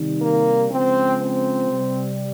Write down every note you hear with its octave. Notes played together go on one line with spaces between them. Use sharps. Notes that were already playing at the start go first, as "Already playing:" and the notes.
Already playing: C3 D#3 G3
A#3
C#3 F3 G#3 C4
C4
C3 G3